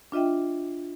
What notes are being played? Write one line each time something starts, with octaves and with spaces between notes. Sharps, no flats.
D4 F4 D#5 E5 G5